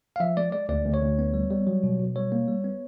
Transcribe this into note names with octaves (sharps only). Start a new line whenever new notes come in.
F5
F3 E5
G#3 D5
G#3 D5
D2 D5
D2
C#5
D2
B3
G3
G3
F#3
B2
B2
G3 C#5
A#3
G3
B3